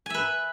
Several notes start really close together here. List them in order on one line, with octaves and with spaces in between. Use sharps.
G#5 E5 B4